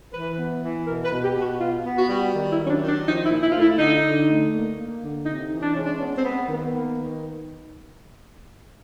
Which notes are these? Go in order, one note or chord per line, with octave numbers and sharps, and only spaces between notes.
E3 B4
B3
E3
B2 A#4
B4
B2
G4
B2
F#4
B3 F4
B3
F#4
G3
D#3
E4
F#3
C#4
D4
D#3
D4
F3 D#4
E4
A#2
E4
A3 F4
E4
D3 D#4
D3
A3
A#3
A#3
D3
C3 D#4
E3
D4
G#3 C#4
D4
B3 C#4
C4
B3
C4
D#3
B3
A#3
D#3